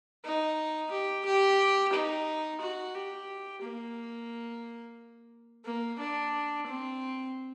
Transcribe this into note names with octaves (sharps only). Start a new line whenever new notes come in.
D#4
G4
G4
D#4
F#4
G4
A#3
A#3
D4
C4